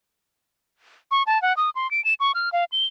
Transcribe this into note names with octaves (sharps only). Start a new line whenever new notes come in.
C#6
A5
F#5
D#6
C6
D7
E7
C#6
F6
F5
G7